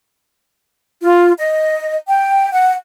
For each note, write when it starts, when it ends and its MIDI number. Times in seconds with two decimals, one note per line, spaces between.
1.02 1.31 65
1.38 1.95 75
2.08 2.51 79
2.52 2.73 78